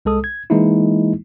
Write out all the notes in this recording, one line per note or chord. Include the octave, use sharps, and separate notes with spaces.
C2 G#3 A4 D#6
G#6
E3 G#3 A#3 D#4 E4